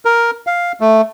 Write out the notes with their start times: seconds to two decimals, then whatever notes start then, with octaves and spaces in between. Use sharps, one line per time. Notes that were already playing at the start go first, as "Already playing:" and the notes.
0.05 A#4
0.47 F5
0.81 A3